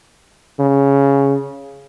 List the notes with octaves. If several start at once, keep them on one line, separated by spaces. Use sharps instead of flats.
C#3